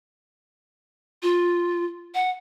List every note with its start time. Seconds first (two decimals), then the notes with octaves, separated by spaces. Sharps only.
1.23 F4
2.15 F#5